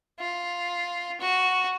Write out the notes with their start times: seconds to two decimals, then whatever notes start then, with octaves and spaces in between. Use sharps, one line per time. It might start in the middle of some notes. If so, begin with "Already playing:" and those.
0.20 F4
1.21 F#4